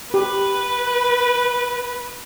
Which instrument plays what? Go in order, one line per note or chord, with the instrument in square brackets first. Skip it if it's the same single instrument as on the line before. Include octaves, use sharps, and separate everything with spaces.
[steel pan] G4 [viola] B4